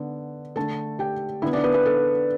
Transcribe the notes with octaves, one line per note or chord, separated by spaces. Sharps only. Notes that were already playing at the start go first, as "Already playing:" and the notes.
Already playing: D3 B3
D3 A3 A4 A5
G4 G5
D3 B3 E4 E5
D4 D5
B3 B4
B3 B4
A4